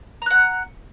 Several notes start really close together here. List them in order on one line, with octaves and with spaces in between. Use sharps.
A#5 F#6 F#5